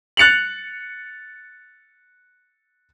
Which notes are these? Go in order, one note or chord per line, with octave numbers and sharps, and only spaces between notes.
F#6 A6 C#7 F7 F#7